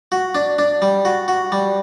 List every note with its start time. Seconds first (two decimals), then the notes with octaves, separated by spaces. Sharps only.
0.12 F#4
0.35 D4
0.59 D4
0.82 G3
1.05 F#4
1.28 F#4
1.52 G3